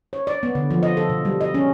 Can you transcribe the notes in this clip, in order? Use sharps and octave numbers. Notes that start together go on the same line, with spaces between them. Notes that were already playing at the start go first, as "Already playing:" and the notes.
C#5
D5
B3
D3
F3
D#5
A4
B2
G3
D#5
C#4